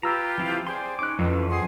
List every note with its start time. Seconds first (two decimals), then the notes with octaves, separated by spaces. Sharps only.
0.03 F4 G4 B4 A#5 E6
0.38 F3 C4 E4
0.67 G#4 C5 D5 G5 C6
0.99 C#4 D#4 D6 F#6
1.19 F2 E3 C#4 B4
1.50 F3 G#4 F#5 C6